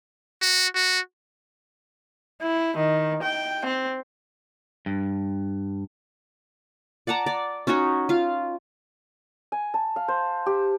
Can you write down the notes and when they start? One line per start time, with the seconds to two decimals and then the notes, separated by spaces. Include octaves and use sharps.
0.42 F#4
0.75 F#4
2.42 E4
2.77 D#3
3.22 G5
3.65 C4
4.86 G2
7.07 D5 F#5 A5 A#5
7.26 D5
7.67 C#4 D#4 F#4 C#5
8.09 F4 F5
9.52 G#5
9.74 A5
9.96 F5
10.08 C5
10.46 G4